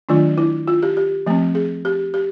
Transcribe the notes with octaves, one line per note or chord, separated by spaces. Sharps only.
D#3 F#3 A3 D4 F4
E4
F4
G4
G4
F3 A3 C4
G#4
G4
G4